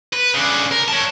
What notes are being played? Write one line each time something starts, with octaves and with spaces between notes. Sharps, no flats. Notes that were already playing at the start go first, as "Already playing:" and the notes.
B4
C#3 D4
A#4
C#5 A5